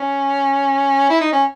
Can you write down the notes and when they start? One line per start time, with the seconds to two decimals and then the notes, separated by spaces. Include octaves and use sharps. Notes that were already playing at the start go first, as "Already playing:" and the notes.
Already playing: C#4
1.10 E4
1.21 D#4
1.32 C#4